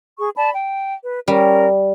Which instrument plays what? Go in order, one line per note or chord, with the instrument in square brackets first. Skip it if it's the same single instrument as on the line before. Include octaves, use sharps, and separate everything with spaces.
[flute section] G#4 C#6
D5 A5 B5
G5
B4
[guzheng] G3 [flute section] C#4 A#4